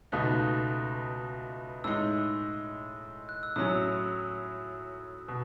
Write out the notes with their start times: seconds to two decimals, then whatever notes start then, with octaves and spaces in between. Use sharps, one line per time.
0.12 C#2 B2 A3 D#4 F#6
1.84 A2 G#3 D#4 E6
3.29 F#6
3.43 E6
3.56 A2 F#3 C#4 D#6
5.28 B2